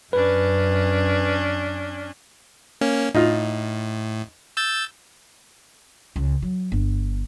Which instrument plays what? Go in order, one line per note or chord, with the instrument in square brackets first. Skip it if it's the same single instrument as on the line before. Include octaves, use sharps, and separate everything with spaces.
[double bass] F#2 [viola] C#4 D4 [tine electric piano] B4
[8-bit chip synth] A#3 C#4
[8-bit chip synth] A2 [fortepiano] D#4 F4
[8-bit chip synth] E6 G6 A6
[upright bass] C#2
F#3
G1